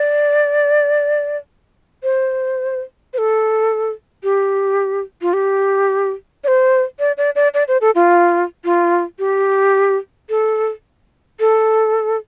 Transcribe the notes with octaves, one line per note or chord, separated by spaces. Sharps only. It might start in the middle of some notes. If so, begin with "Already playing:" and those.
Already playing: D5
C5
C5
A4
G4
F4
G4
D5
C5
D5
D5
D5
D5
C5
A4
F4
F4
G4
A4
A4